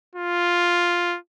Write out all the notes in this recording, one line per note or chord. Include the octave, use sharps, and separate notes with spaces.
F4